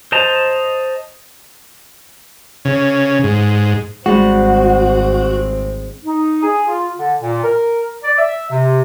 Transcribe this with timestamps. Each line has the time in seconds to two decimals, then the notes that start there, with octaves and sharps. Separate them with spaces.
0.12 C5 D#5 A5 A#5
2.65 C#3
3.24 G#2
4.06 G#1 G3 G#3 C4 F#4
6.04 D#4
6.43 G#4
6.68 F4
6.97 D3
7.20 A#2
7.43 A#4
8.04 D5
8.18 E5
8.51 C3